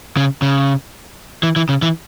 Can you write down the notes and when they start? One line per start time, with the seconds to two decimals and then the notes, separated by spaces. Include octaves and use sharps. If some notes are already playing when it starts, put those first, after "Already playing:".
0.17 C#3
0.42 C#3
1.43 E3
1.56 E3
1.69 C#3
1.82 E3